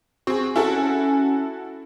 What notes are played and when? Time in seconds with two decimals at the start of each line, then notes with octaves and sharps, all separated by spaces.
0.27 C4 F#4 G#4
0.56 C#4 E4 F#4 A4